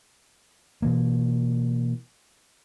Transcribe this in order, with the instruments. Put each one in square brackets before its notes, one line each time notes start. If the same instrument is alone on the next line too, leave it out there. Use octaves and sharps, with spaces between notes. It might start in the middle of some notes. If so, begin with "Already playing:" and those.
[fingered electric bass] B2 E3 A#3